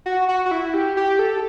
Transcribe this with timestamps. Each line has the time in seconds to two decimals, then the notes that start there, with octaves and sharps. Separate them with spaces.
0.06 F#4
0.29 F#4
0.46 F#4
0.51 E4
0.74 G4
0.97 G4
1.19 A4